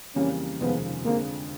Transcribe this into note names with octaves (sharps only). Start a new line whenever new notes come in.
F2 C#3 E3 G3 A#3 C#4
F1 D#2 C#3 F3 G#3 B3
F2 D3 F3 G#3 A#3